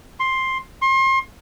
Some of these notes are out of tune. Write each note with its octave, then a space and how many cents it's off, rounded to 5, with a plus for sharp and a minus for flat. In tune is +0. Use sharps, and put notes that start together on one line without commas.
C6 +10
C6 +35